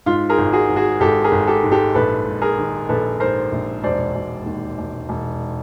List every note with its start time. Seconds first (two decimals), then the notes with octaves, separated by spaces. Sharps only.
0.06 G#2 F4
0.30 G#4 A#4
0.38 G#1
0.53 F#4 G#4
0.69 G#1
0.76 F#4 G#4
1.00 G#1 G4 A4
1.24 G#4 A#4
1.31 G#1
1.47 G4 A4
1.63 G#2
1.72 G4 A4
1.94 A#1 A4 B4
2.26 G#2
2.42 G#4 A#4
2.58 D#3
2.89 A#1 A4 B4
3.20 G#2 A#4 C5
3.52 A#1
3.84 E1 C5 D5
4.15 E1
4.46 D#2
4.78 E1
5.09 E1